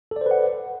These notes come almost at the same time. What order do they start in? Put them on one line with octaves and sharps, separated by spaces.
A4 D5 C5 B4 F#5